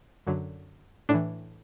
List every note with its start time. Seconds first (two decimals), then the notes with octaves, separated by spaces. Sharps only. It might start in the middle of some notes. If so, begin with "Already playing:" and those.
0.27 F#2 D3 F#3
1.09 A2 E3 D4